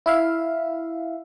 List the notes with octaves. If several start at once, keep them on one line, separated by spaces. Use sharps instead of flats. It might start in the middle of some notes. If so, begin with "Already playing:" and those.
E4 E5 F5